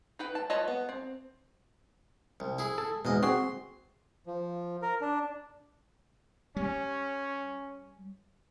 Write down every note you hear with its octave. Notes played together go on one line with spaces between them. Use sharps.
D#4 B4 G5
A5
F4 B4 C#5 D#5 A5
B3
C4
C2
E4 G#4
A4
E2 G#2 B2 D#5
C4 F#4 G#4 C6
F3
A#4
D4
G3 C#4